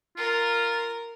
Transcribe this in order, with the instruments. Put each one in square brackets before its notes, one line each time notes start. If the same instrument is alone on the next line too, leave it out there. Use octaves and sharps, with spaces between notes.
[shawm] F4 [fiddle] A#4